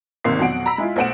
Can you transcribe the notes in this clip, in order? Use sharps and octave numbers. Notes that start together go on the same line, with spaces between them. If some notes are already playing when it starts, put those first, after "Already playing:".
G#1 C3 D#3 A#3 C6 C7
F2 B2 F#3 F#5 D7
A#5 B5 E6 B6
G#3 E4 F4
B1 A3 C5 F#5 D7 E7